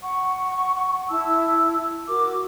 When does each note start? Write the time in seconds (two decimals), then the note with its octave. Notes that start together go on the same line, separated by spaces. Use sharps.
0.02 F#5 C#6
1.10 E4 A5 E6
2.08 F#4 A#4 D6